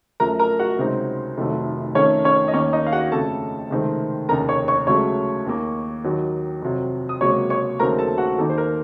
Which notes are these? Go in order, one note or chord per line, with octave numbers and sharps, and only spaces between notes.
F#2 F3 A3 A#4 A#5
A#4 A#5
F#4 F#5
C#2 C3 F#3 C4 D#4
F1 F2 D#3 F#3 A3
F2 D#3 A3 C#4 C#5
C#4 C#5
D#5
D#2 D#3 A#3 C#4 C#5
D#4 D#5
F5
F#4 F#5
F2 C#3 A3 A4 A5
C#2 C3 D#3 A3 C4
F1 D#2 C#3 A#4 A#5
C#5 C#6
C#5 C#6
C#2 C#3 F#3 A3 C#5 C#6
D#2 D#3 A#3
D#2 D#3 F#3
F2 C3 F#3
D#6
C#2 C3 F#3 A#3 C#5 C#6
C#5 C#6
D#2 C#3 F#3 A3 C4 A#4 A#5
A4 A5
F#4 F#5
D#2 D#3 A#3 D#4 A4
C5
A#4